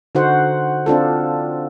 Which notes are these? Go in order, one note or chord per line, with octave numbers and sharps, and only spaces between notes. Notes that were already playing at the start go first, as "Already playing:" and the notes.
D3 D#4 F#4 C5 F#5
C4 D4 F4 A4